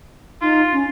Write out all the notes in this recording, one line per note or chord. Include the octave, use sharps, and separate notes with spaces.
D#4 F4
C#4